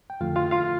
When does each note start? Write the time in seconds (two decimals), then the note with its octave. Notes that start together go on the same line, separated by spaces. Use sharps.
0.10 G5
0.20 F2 D3 F3 A3 F4 F5
0.36 F4 F5
0.51 F4 F5